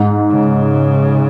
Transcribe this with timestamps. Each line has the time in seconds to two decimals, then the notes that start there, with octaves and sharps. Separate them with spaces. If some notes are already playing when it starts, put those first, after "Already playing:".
Already playing: G#2
0.30 C#3